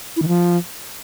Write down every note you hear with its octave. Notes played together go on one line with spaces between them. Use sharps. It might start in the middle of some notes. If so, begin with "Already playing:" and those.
E4
D#3
F3